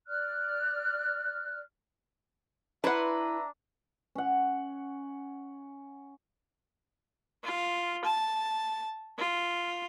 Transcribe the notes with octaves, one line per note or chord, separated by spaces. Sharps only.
D5 F6 F#6
D4 E4 B4 E5 F#5 A#5 C6
C#4 F#5
F4
A5
F4